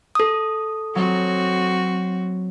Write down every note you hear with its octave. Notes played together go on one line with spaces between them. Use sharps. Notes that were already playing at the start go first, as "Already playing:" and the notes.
A4 D#6
F#3 C4 F#4